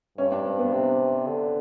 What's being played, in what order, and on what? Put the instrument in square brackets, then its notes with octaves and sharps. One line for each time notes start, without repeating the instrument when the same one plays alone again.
[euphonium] G2 [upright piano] C#4
[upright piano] D4
C4
B3
[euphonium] C3 [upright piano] C4
[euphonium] D3